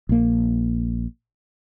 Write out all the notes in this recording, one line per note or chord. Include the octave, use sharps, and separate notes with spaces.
A#1 A#3